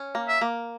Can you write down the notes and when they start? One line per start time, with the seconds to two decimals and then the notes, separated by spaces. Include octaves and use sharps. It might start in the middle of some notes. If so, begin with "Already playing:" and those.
Already playing: C#4
0.15 A#3
0.28 E5
0.41 A#3